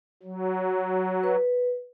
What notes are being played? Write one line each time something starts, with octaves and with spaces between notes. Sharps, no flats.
F#3
B4